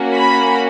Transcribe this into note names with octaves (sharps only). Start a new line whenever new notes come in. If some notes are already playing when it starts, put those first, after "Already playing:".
Already playing: A#3 C#4 F#4
B5